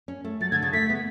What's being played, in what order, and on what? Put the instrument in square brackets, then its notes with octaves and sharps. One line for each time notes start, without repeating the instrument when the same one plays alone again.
[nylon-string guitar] C#4
A3
[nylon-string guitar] F#3 [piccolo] A6
[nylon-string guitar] D3 [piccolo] G#6
[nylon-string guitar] C#3 [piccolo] A6
[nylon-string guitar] A3 [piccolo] B6
[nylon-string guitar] B3